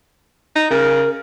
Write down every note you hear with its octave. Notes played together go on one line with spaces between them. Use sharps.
D#4
C#3 A#4